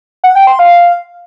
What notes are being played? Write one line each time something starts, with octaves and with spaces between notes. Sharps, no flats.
F#5
G5
C6
F5